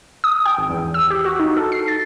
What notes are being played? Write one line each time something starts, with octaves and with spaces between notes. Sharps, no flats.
D#6
G5
G#1
E2
E6
G4
F#4
D#4
A4
C7
A6